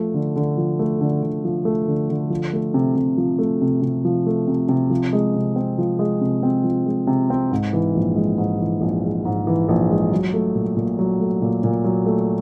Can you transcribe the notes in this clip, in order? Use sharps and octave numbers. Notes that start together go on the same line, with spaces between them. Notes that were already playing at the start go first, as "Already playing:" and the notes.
Already playing: F3 A3
D3
D3
F3
A3
D3
D3
F3
A3
D3
D3
F3
A3
C3
C3
F3
A3
C3
C3
F3
A3
C3
C3
F3
G#3
C3
C4
F3
G#3
C3
C4
F3
G#3
C3
C4
G#2
E3
A#1
G#3
G#2
E3
A#1
G#3
G#2
E3
A#1
G#3
F#3
A3
A#2
A#2
F#3
A3
A#2
A#2
F#3
A3